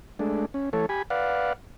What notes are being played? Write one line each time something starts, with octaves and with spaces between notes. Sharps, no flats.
G#3 A3 D4
C#4
E3 A3 A4 C#5
G4 G#5 B5
B4 D5 F5 F#5